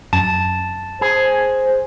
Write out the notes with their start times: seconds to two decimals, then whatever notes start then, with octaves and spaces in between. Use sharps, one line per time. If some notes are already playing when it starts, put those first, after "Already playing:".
0.13 F#2 A5
1.01 G#4 C5